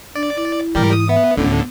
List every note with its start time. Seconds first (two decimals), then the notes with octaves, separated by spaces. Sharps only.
0.15 D4 D5
0.36 E4
0.75 G#2 E3 G3 G4 A#4
0.93 D#6
1.09 B3 E5
1.37 D2 A2 D3 B3 C#4